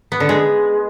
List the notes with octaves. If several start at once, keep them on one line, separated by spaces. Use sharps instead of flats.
B3
D3
G#3